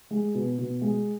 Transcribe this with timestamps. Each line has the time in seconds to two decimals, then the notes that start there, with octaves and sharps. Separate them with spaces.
0.11 G#3
0.35 B2
0.58 B2
0.81 G#3